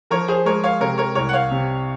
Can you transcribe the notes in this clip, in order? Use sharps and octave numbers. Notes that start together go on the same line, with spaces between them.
F3 A#4 C#5
G#4 C5
G#3 A#4 C#5
C#5 F5
C3 A#4 C#5
A#4 C#5
C2 A#4 C#5
F#5
C#5 F5
C3